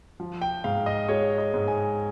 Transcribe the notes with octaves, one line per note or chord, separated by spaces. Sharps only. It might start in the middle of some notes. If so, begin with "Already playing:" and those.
F3
G5
G#2 F5
D#5
G#3 C#5
D#5
G#2
G#5